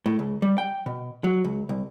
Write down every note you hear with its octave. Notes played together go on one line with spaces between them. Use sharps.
A2
C#2
G3
G5
B2
F#3
C#2
C2